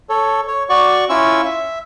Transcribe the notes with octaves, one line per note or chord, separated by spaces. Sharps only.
A4 C#5
C#5
F#4 D5 C#6
C#4 E4 F4 C#6 E6
E5